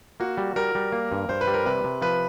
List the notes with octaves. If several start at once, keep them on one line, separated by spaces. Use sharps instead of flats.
A#3 F#4
G3
G3 A#4
G3
A#3
G2
G2 C5
B4
G3
A#4
C3 B4
C3
F3 B4